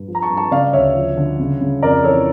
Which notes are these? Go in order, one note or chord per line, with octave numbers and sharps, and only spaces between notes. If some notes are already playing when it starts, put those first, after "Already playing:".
Already playing: G2
F3
A#5
A5 C#6
G2
A5 C#6
C#3 D5 F5
D2 C#5 E5
F3
D3
C#3
C#3
F2 A#4 D5
E3 A4 C#5